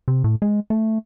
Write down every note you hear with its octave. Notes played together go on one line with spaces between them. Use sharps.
C3
A2
G#3
A3